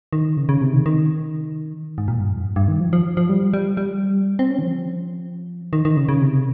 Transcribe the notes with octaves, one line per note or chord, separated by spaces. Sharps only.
D#3
C#3
C#3
C3
D#3
D#3
G#2
A#2
G2
F2
G2
G2
D#3
F3
F3
F3
G3
G3
G3
C4
C#4
D#3
F3
D#3
D#3
C#3
C#3
C3